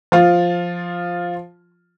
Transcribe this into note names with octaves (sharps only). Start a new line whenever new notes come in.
F3 F4